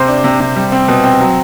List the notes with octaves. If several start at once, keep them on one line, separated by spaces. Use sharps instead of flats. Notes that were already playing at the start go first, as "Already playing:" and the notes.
Already playing: C3 C5
D4
C3
C3
G3
C4
B2
C4
F#3